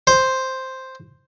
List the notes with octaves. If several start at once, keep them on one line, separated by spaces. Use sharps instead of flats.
C5